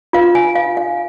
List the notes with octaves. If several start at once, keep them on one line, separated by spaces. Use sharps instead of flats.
F4 B4 F5
G#5
F5
F5